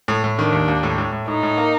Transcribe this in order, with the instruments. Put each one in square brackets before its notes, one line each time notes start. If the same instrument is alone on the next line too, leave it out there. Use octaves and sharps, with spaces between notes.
[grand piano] A2
A2
[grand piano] D#3 [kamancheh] D4
[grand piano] D#2
D#2
A2
A2
A2
[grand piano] A2 [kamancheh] D#4
[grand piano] A2
A#3